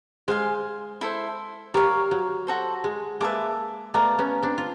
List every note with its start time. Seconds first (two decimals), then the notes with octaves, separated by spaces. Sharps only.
0.28 G#3 C5 F5 G#5
1.01 E4 A4 C5
1.74 G3 A#4 C#5 F5
2.11 F#3
2.47 F#4 A4 C5
2.84 G#3
3.20 G#3 A#3 B4 E5 A5 D6
3.94 A3 B3 A#4 D5 F5 A#5
4.18 B3 C#4
4.43 C4 D4
4.58 F4